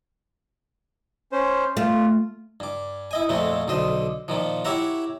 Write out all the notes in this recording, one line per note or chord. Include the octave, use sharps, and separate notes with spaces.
C#4 C5
A3 F4
G2 D6
E4 D#5 G#5
F2 A#2 G#3 A3 C4
B1 D3 C5 D#5
A#2 D#3 F3
E4 G4 C#5 E5 F#5 A#5